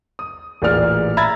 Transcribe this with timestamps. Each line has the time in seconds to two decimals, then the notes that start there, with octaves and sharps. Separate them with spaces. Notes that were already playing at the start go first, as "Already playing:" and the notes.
0.19 D#6
0.62 A1 A#2 G#4 D5 F6
1.17 E5 A#5 B5 E6 G#6 A6